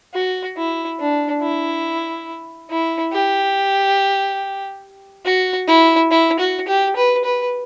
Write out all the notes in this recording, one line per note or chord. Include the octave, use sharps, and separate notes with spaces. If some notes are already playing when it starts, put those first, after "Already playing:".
F#4
E4
D4
E4
E4
G4
F#4
E4
E4
F#4
G4
B4
B4